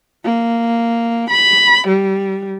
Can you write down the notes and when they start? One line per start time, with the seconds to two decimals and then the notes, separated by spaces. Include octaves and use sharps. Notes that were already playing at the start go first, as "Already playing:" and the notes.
0.24 A#3
1.30 B5
1.88 G3